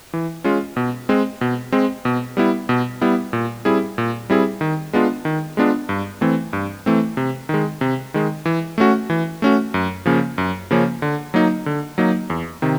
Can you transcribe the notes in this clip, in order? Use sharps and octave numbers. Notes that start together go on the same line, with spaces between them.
E3
G#3 C#4 F4
B2
G#3 C4
B2
G#3 C4
B2
G3 B3 E4
B2
G3 B3 E4
A#2
G3 C4 E4 G#4
A#2
G3 C4 E4 G#4
D#3
G#3 B3 D4 F4
D#3
G#3 B3 D4 F4
G2
E3 A3 C4
G2
E3 A3 C4
C3
D#3 G#3
C3
D#3 G#3
E3
A3 C#4 F#4
E3
A3 C#4 F#4
F#2
C#3 F3 A#3 C#4
F#2
C#3 F3 A#3 C#4
D3
F#3 A#3 D#4
D3
F#3 A#3 D#4
E2
C3 D#3